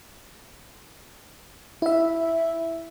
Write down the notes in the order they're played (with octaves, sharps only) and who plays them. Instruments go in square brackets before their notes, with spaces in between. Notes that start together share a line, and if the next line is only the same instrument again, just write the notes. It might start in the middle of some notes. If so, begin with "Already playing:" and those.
[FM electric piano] E4 E5